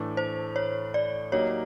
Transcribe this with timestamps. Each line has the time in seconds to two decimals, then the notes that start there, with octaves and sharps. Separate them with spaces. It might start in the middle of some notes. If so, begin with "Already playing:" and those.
Already playing: A2 E3 A3 D4
0.17 C5
0.56 C#5
0.94 D5
1.32 F#3 A#3 D#4 G4 C#5